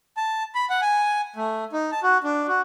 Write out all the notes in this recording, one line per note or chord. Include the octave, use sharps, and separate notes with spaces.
A5
B5
F#5
G#5
A3
D#4
A5
F#4
D4
F#4